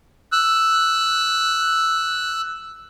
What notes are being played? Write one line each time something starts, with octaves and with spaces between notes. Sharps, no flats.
E6 F#6